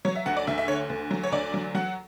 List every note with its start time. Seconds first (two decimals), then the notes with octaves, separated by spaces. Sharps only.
0.05 F#3 C#5
0.15 E5
0.26 D2 F#5
0.37 D5
0.47 D2 E5
0.58 E5
0.68 D3 C#5
0.90 D2
1.11 F#3
1.23 C#5
1.32 D2 D5
1.54 F#3
1.75 F#3 F#5